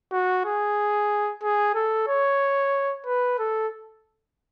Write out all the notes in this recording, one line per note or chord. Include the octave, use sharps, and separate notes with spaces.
F#4
G#4
G#4
A4
C#5
B4
A4